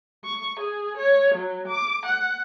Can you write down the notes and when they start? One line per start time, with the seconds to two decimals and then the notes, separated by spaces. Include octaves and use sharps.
0.24 C#6
0.60 G#4
0.98 C#5
1.35 F#3
1.68 D6
2.06 F#5